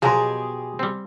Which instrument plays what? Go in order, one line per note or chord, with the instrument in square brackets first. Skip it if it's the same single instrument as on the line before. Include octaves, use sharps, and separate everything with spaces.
[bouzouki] B2 G4 G#4 [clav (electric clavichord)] F3 F#3 A#4 [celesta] G#5 C6
[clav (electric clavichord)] G3 C4